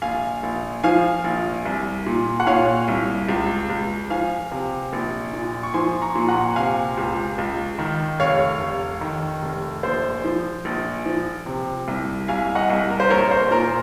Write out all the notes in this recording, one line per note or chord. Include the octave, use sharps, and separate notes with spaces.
A#1 F5 G#5
A#1
F3 F5 G#5
A#1
C2
A#2
F#5
A#2 C#5 F5
C2
C#2
C#2
F3 F5 G#5
C3
A#1
A#2
C#6
F3 G#5 C6
A#5 C#6
A#2
F#5 A#5
C3 F5 G#5
C#2
C#2
D#3
F1 C#5 F5
F1
D#3
F1
A#1 C5
F3
A#1
F3
C3
C2
C2 F5 G#5
D#5 F#5
C2
A#4
C5
A#1 A#4 C#5
C5
A#2 A#4